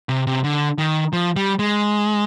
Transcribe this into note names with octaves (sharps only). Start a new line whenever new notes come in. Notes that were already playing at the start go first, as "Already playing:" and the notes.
C3
C3
D3
D#3
F3
G3
G#3